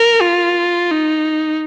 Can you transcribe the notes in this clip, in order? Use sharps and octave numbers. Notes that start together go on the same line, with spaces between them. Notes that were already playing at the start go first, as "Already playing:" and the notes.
Already playing: A#4
F4
D#4